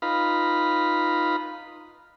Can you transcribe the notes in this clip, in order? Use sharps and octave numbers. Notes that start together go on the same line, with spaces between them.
D#4 F4 B4 F5 A#5 B5